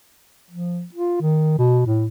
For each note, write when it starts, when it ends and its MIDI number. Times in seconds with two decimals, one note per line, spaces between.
0.51 0.84 53
0.94 1.20 65
1.21 1.54 51
1.59 1.84 47
1.87 2.06 45